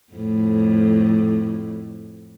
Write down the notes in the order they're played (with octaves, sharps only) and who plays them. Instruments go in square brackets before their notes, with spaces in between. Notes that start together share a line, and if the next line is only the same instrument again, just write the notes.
[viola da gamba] F2 A2